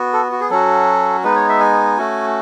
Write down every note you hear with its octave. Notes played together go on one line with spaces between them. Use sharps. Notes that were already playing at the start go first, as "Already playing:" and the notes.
Already playing: B3 F#4
A4
F#4
G#4
F#3 C#4 F#4 A4
G#3 B3 D#4 B4
C#5
E5
G#5
A3 C#4 F#4